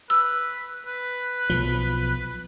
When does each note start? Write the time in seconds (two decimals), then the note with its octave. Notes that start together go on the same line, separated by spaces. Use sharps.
0.10 B4 E6
0.86 B4
1.50 B1 F3